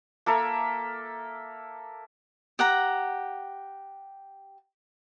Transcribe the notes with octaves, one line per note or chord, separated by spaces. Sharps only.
A#3 A4 A#4 E5
G4 F#5 A#5